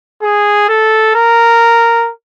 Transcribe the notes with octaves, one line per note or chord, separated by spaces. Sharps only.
G#4
A4
A#4